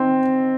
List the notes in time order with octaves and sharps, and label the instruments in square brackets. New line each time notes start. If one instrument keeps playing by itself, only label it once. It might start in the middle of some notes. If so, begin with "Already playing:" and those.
Already playing: [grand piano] C4 D#4